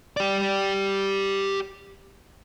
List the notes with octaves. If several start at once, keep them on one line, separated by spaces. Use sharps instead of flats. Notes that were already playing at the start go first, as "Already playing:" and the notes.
G4 D5